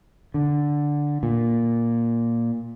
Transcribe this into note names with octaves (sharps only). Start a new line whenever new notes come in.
D3
A#2